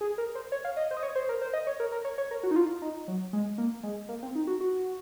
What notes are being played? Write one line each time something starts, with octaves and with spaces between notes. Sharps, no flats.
G#4
A#4
C5
C#5
F5
D#5
C5
D#5
C#5
C5
A#4
C5
D#5
C#5
A#4
A#4
C#5
C#5
A#4
F#4
D#4
F4
D#4
F#3
G#3
A#3
G#3
A#3
C4
D#4
F#4
F#4